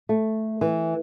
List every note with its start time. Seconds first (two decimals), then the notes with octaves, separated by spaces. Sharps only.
0.09 A3
0.61 E3